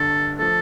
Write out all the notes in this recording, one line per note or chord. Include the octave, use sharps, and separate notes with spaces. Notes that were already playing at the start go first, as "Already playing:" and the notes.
Already playing: G1 G2 D3 A4
F3 A3 A4